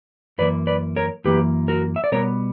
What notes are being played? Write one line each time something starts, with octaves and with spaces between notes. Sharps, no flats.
F#2 E3 A#3 B4 D5
B4 D5
A#4 C#5
F#2 E3 A#3 G4 B4
F#4 A#4
E5
D5
B2 G3 B3 A#4 C#5